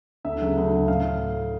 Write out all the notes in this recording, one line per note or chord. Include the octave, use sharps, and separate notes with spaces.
D2 E5
C#3 F#3
D2
C#3 F#3
A2 F5